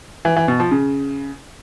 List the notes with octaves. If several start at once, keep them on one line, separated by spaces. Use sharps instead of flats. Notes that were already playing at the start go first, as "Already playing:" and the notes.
E3
E3
B2
F3
C#3